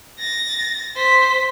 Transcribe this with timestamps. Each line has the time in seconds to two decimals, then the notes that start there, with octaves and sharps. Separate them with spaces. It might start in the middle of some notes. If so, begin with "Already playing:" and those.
0.19 A6 A#6
0.96 C5 B6